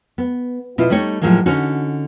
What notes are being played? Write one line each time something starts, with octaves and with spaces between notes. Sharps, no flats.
B3
B2 E4 F4
G3 A3 D#4 C#5
A2 F3 F#3 G#3 A#3
D3 C#4 D#4 F#4